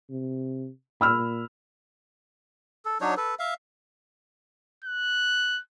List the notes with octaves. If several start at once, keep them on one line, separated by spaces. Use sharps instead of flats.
C3
A#2 B5 E6 F6
A4
F#3 D4 D#4 C#5
A4 B4
E5 F5
F#6